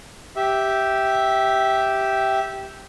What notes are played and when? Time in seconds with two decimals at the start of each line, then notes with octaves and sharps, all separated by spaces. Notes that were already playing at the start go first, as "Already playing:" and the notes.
0.36 G4 E5